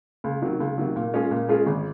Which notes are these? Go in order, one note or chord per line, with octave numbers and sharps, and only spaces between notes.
C#2
C3 D#3 F#3
C#2
C3 D#3 F#3
A#2
G#3 C#4 F4 G#4
A#2
G#3 C#4 F4 G#4
G#1